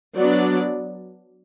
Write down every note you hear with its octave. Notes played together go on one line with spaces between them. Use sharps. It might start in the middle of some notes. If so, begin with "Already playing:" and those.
F#3 B3 D4 D5